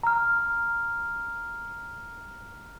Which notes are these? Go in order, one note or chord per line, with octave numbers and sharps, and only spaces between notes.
A#5 F6